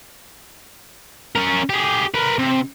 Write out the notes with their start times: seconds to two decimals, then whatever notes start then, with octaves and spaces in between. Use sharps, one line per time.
1.35 C#4 A#4
1.70 G4 G#4
2.14 A#4 B4
2.39 C3